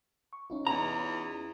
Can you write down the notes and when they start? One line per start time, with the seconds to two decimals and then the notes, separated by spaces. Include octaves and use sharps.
0.33 C#6
0.50 C#4 D#4 F4
0.67 E2 A#5